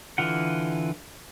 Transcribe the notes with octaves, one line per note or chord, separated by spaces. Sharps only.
D3 E3 F4 F#5